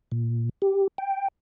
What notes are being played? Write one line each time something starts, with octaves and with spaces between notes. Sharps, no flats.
A#2
G4
G5